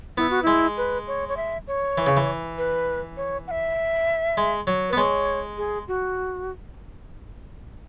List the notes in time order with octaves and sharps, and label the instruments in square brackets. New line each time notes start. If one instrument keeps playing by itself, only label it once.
[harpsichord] B3 [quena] E4
[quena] F#4
[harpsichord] G#3 [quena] E4
[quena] B4
C#5
C#5
E5
C#5
[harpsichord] E3
C#3
E3
[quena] B4
C#5
F#5
E5
[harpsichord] G#3
F#3
[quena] B4
[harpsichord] B3
[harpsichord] G#3 [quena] C#5
[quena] G#4
F#4